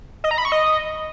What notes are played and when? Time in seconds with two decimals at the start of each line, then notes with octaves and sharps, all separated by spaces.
0.24 D#5
0.31 A#5
0.38 B5
0.45 C#6
0.52 D#5